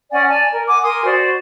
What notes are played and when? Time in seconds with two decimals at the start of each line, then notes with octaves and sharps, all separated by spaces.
0.10 C#4 D5 F#5 G#5
0.27 D5 G#5 A5
0.51 A#4
0.66 F#5 G#5 D6
0.82 A#4 G#5 C6 D#6
1.04 F#4 C5 D5